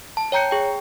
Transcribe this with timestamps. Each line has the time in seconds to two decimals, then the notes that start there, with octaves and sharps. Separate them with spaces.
0.17 A5
0.32 C#5 G5 A#5 G6 C#7
0.51 G#4 G5